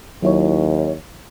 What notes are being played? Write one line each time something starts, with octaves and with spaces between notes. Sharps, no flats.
D#2 F#3 E4 C#5